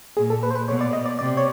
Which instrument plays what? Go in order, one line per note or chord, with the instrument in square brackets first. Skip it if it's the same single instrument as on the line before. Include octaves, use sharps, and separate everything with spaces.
[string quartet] A#2 [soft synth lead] G#4
[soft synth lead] A4
B4
C5
B4
[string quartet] B2 [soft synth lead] C#5
[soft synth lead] D5
D#5
D5
[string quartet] C3 [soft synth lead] D5
[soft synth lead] C#5